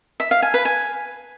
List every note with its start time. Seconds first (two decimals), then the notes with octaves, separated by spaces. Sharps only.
0.20 E5
0.31 F5
0.42 G#5
0.54 B4
0.65 G#5